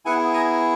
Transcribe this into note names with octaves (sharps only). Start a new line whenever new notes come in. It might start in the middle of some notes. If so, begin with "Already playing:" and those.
B3 E4 G#4 F#5 G#5
G#5 A#5